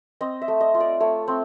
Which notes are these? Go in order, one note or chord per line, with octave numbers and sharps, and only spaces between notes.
C4 D#5
E5
A3
D#5
F4
D5
A3 C#5
C4